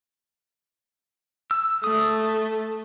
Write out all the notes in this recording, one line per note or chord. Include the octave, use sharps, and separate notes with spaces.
E6
A3 D#6